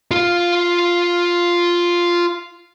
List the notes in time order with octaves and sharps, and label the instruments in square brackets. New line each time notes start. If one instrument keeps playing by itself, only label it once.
[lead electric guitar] F4 F5